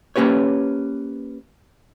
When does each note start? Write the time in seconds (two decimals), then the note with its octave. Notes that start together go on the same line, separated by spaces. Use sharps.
0.16 A#3 C#4 G4 B4 C#5